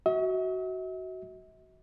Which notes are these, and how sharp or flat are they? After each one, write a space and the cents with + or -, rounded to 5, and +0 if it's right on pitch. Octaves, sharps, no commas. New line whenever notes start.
F#4 +10 E5 -45